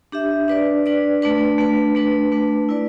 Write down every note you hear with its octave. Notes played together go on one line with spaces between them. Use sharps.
D4 G4 E5
D4 B4 D5
D4 B4 D5
A3 D4 B4
A3 D4 B4
A3 D4 B4
A3 D4 B4
E4 B4 D5